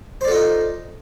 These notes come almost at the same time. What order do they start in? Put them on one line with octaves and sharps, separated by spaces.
C5 D5 A4 F4 D#4